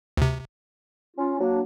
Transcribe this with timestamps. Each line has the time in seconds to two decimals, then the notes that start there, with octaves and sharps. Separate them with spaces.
0.17 D2 C3
1.17 C#4 F4
1.39 F#3 A#3 D4